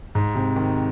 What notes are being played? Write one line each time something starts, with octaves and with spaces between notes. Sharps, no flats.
G#2
C3
D#3